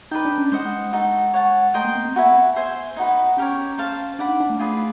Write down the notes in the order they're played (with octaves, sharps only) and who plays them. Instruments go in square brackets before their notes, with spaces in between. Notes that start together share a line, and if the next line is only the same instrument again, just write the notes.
[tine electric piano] D#4 [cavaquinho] B4 D5 G5
[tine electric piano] D4
C#4
[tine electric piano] G#3 [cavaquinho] C5 D#5 F#5
[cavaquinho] D#4 F#4 A4
C#5 F#5 A5
[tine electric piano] A3 [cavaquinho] A#4 D#5 G5 C6
[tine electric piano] A#3
B3
C4
[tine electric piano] B3 [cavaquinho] F#4 B4 E5 G#5
[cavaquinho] C5 E5 G#5 C6
D#4 F#4 B4
[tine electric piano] C#4 [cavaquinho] G4 A#4 C#5
[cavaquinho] C5 F5 A5
[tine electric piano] D4 [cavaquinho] D5 F#5 B5
[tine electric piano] D#4
D4
A3
[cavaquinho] F4 G#4 B4 D5